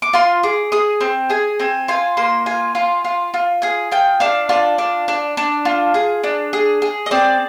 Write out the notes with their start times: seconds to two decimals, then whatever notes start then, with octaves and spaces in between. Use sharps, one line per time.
0.02 D6
0.13 F4 C6
0.43 G#4 D6
0.72 G#4 D#6
1.01 C4
1.30 G#4 G#5
1.59 C4 G#5
1.88 F4 G#5
2.17 A#3 C6
2.46 F4 G#5
2.75 F4
3.05 F4
3.34 F4
3.62 G#4 G#5
3.92 F4 G5
4.20 D4 F5
4.49 F4 D5
4.78 D4
5.08 D4
5.37 D4
5.65 F4
5.94 G#4
6.24 D4
6.53 G#4
6.82 G#4
7.06 D#5
7.11 C4 D5